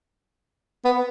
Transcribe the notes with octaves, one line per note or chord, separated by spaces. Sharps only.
B3